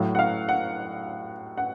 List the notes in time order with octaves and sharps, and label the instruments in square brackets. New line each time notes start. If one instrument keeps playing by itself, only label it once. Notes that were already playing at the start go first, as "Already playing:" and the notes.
Already playing: [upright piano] A2 F#3 F5
F#5
F5
F#5
F#5